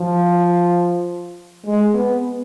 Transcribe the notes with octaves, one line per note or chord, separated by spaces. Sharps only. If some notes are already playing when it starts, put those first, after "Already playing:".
Already playing: F3
G#3
B3